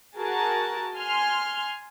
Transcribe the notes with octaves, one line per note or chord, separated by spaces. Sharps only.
F#4 G#4 A#4 A5
G#5 C6 F6